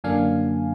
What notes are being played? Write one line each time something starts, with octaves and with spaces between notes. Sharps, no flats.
F#2 D3 F#3 A#3 D4 F5 G#5